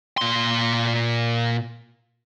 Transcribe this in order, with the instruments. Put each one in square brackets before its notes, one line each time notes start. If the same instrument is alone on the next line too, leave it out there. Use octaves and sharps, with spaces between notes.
[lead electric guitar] A#2 C6